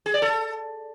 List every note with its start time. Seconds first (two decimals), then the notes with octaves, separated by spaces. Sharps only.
0.06 G#4
0.14 D5
0.22 A4